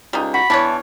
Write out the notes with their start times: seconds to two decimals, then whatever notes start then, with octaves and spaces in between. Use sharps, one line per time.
0.13 C#2 G3 D#4
0.34 F#4 B5
0.50 E2 D4 E4 B4 C#5 A5